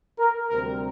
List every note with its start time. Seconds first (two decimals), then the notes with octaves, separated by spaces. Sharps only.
0.18 A#4
0.50 D2 C3 G3 C4 A#4